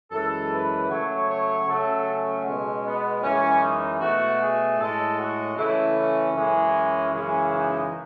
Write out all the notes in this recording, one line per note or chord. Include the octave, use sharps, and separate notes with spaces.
F#2 E3 G#3 A4
B4
C#3 F#3 A3 C#5
C#5
C#3 F#3 A3 A4
C#4
B2 G#3
B3
F#2 E3 G#3 C#4
D#4
B2 A3 F#4
G#4
A2 G#3 A4
F#4
C#3 E3 A3 E4
C#4
F#2 E3 G#3
F#2 C#3 E3 G#3 C#4
D#4